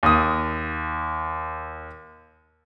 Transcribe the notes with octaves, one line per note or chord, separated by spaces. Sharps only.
D#2 D#6